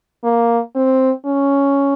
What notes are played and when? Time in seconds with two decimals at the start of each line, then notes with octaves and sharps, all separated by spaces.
0.23 A#3
0.75 C4
1.26 C#4